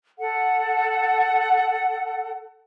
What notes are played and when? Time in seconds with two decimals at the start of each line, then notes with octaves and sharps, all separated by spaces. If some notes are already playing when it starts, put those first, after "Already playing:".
0.18 A4 F#5